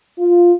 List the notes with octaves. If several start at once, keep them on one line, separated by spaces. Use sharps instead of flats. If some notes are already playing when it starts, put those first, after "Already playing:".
F4